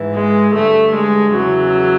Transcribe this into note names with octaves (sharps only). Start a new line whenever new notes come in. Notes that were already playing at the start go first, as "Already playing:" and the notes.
Already playing: G#2 E3
G#3
G2 D3 A3
G#3
E2 C#3 E3 F#3